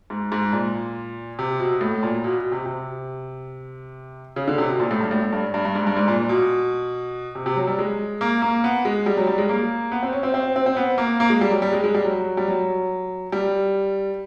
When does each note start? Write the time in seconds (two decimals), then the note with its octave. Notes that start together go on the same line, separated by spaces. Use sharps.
0.10 G#2
0.32 G#2
0.52 A#2
1.39 C3
1.60 B2
1.81 A2
2.03 A#2
2.24 B2
2.38 B2
2.52 C3
2.66 C3
4.36 C#3
4.48 D3
4.58 C3
4.69 B2
4.80 A#2
4.91 A2
5.01 G2
5.11 A2
5.22 A2
5.33 G2
5.54 G2
5.65 G2
5.75 G#2
5.87 G2
5.97 G#2
6.08 A#2
6.29 B2
7.35 C3
7.46 C3
7.56 F#3
7.67 G3
7.79 G#3
8.21 A#3
8.42 A#3
8.64 B3
8.85 G#3
9.06 G3
9.17 F#3
9.27 G3
9.38 G#3
9.49 A#3
9.92 B3
10.03 C4
10.13 C#4
10.23 C4
10.34 C4
10.56 C4
10.66 C4
10.77 B3
10.98 A#3
11.20 A#3
11.30 G#3
11.41 G3
11.51 F#3
11.62 G3
11.73 G#3
11.84 G#3
11.95 G3
12.05 F#3
12.37 G3
12.48 F#3
13.32 G3